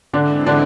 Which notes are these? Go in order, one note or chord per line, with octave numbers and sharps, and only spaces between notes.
D3 E3 G#3 C4 D4 E4
D3 D4